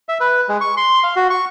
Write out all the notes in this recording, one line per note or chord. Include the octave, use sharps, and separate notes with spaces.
E5
B4
G#3
C#6
C6
F5
F#4
C#6